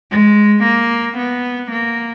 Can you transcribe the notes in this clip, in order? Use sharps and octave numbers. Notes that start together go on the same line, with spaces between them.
G#3
A#3
B3
A#3